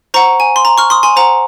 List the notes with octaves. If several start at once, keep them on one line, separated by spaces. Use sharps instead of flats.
C5 F#5 A#5 C#6
G#5
C6
A#5
C#6 F6
C6 D#6
G#5 C6
C5 F#5 A#5